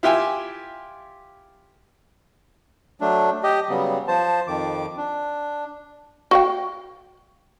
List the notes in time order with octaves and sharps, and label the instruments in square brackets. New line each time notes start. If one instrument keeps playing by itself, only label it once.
[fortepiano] E4 F4 G4 E5 G5 G#5
[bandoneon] F#3 A3 D4
G4 D#5
C#3 F#3 G3 B3
F3 C5 A5
F2 D#3 D6
D4
[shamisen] F#4 F5 G5